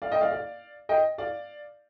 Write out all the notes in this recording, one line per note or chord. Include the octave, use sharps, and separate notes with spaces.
D5 F5
D#5 G5
D5 F5
D5 F5
D#5 G5
D5 F5